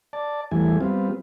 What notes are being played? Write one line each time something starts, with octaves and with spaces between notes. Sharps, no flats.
D5 A5
E2 E3 G3 A3 G#5
G3 B3 C4 F4